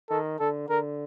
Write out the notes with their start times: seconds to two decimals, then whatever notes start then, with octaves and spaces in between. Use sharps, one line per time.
0.10 D#3 A4
0.40 D3 A4
0.69 D3 A#4